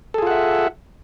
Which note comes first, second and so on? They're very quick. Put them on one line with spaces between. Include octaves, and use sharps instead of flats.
A4 G#4 F4 F#5 E5